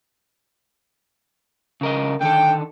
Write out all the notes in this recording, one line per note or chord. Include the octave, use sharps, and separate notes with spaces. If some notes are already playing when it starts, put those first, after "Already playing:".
C#3 A#4 D#5
D3 D#3 A4 G5